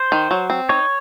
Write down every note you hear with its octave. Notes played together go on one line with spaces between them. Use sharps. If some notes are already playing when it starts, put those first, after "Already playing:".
Already playing: C5
D#3
F#3
C4
D#4 C#5